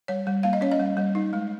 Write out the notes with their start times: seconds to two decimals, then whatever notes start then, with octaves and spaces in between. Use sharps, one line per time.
0.08 G3 C#5
0.27 G3
0.43 A#3 F5
0.53 D#5
0.61 C#4 C#5
0.72 D#5
0.80 G3
0.97 G3
1.15 D#4
1.33 G#3